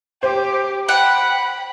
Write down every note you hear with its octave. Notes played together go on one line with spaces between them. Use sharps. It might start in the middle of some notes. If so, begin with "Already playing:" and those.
G4 C5
F#5 G5 B5